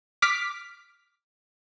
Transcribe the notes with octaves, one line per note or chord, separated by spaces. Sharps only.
D6 F6 B6